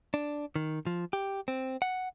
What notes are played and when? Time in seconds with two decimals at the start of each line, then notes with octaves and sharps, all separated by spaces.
0.14 D4
0.56 D#3
0.87 F3
1.13 G4
1.48 C4
1.82 F#5